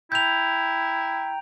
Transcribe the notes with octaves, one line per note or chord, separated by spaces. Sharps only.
E4 G5 A#5 G6 F7